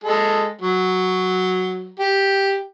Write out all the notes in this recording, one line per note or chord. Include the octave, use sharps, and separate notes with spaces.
G#3 A4
F#3
G4